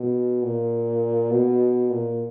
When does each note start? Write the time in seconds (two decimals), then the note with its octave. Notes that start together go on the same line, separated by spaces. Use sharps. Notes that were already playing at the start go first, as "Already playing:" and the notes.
Already playing: B2
0.43 A#2
1.31 B2
1.90 A#2